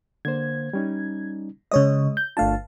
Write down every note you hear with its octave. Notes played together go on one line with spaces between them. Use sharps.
D3 A#3 C5 G#6
G3 C#4 D#4
C#3 G#3 C#5 D#5 D#6
G6
G1 A3 D4 F4 F5 A5